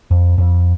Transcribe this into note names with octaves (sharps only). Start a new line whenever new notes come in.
F2
F2